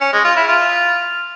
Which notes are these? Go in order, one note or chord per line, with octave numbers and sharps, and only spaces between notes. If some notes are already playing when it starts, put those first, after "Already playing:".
C#4
G#3
F4
E4
F4